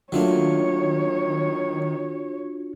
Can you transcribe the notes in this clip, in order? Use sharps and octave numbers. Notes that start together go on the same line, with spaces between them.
D#3 F#3 A3 A#3 D4 F4 F#4 C#5